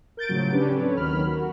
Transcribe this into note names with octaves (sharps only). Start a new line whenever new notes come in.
A#4 G6 A6 D7
A2 C#3 F3 F#3
C#3 C#4 D4 G4 B4
C4 A4 B4 C#5
D#2 D#3 F#3 B5 F6
F#4 A#4